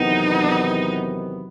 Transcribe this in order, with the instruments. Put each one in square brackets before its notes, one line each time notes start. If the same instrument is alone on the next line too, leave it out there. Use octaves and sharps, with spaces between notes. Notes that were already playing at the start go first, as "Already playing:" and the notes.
Already playing: [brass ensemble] E2 C3 D#3 F#3 B3 [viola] D#4